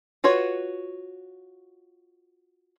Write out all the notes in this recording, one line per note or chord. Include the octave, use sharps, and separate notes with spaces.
F4 F#4 B4 C#5